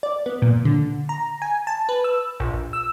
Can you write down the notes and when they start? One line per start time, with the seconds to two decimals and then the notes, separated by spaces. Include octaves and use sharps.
0.03 D5
0.26 B3
0.42 A#2
0.65 D3
1.09 A#5
1.42 G#5
1.67 A5
1.89 B4
2.04 E6
2.40 A#1
2.73 E6